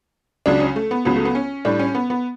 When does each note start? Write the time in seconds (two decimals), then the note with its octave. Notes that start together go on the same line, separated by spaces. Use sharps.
0.46 C#2 C#3 F#3 D4
0.60 C#4
0.76 A3
0.91 B3
1.05 C#2 C#3 F#3 B3
1.16 A3
1.25 B3
1.35 C#4
1.65 A2 G3 D4
1.80 C#4
1.95 B3
2.10 B3